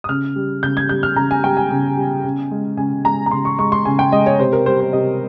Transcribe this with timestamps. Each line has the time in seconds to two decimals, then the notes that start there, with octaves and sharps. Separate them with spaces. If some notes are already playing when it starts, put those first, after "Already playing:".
0.04 D#6
0.09 C#3 F6
0.36 G3
0.63 C#3 G6
0.77 G#6
0.89 G3 G6
1.03 F6
1.16 C#3 A#5
1.31 G#5
1.44 G3 G5
1.57 G#5
1.70 C#3
1.97 G3
2.24 C#3
2.51 G#3
2.77 C#3 G#5
3.05 G#3 A#5
3.26 A#5
3.31 C#3 C6
3.45 C#6
3.59 G#3 C#6
3.72 C6
3.85 C#3 G#5
3.99 G5
4.12 G#3 D#5
4.26 C#5
4.40 C3 C5
4.53 A#4
4.66 G3 C5
4.80 C5
4.93 C3 D#5